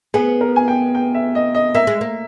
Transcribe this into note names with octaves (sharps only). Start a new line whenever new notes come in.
B3 G#4
A#4
G#5
G5
G5
E5
D#5
D#5
A#3 E5
G#3
A#3